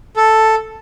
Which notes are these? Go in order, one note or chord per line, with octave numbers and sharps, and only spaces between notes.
A4